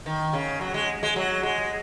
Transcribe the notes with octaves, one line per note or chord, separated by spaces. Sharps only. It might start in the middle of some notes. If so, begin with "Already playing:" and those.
D#3
C#3
F#3
G#3
G#3
F#3
G#3